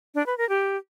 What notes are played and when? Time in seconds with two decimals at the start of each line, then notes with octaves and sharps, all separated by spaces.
0.15 D4
0.26 B4
0.38 A#4
0.49 G4